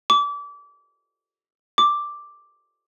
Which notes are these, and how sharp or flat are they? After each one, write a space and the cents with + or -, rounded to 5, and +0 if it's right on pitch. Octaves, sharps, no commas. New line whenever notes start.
D6 -30
D6 +0